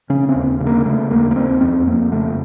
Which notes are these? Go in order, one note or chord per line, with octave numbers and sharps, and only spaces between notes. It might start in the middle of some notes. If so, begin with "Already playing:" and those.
C#3 C#4
C4
D#2
C#3
A#3
C#3 A3
D#2 A#3
A#3
D#2 C4
F2 C4
F2 A#3
C#3 A3